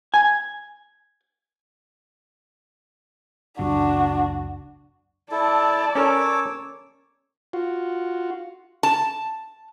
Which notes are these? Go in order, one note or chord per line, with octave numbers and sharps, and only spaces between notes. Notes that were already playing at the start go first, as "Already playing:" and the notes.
G#5
F#1 C#2 F#2 D4 F#4
E4 A4 D5 A5
C#4 A4 A#4 C#5 D6 E6
F4 F#4
A5